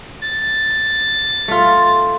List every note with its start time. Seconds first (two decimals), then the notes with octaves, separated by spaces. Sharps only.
0.22 A6
1.48 A3 F4